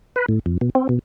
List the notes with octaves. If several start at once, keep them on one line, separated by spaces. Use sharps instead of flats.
B4
A2
F2
B2
C4
B2